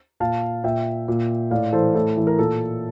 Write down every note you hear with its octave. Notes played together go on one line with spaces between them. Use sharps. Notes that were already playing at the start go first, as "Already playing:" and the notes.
A#2 F5 A5
A#2 E5 G5
A#2
A2 D5 F5
E3 A4 C5
A2 A4
E3
A#4
A#2 A4